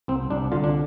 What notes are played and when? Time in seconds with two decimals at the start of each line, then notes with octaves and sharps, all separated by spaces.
0.08 C2 C4
0.30 C2 D4
0.52 D3 F4
0.64 D4